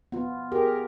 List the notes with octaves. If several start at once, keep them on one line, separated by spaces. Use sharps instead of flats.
B3 F4
G4 G#4 A#4